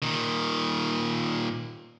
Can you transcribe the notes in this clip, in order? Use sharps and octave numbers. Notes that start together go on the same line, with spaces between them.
A#2 D#3